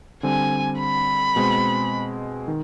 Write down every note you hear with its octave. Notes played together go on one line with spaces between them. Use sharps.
D3 G3 C4 G#5
B5
B2 G#3 C4
D#3